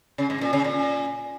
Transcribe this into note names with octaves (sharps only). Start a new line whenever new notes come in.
C#3
G#2
A#2
C#3
A#2